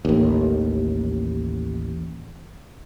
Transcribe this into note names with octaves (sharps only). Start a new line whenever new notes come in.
A1 D#2